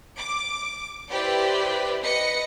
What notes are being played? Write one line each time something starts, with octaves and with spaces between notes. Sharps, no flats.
D6
E4 G4 B4 C5 D5
B4 D#5 A#6 C#7